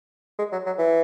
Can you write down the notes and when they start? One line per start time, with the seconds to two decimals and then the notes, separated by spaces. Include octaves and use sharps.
0.38 G#3
0.52 F#3
0.66 F#3
0.78 E3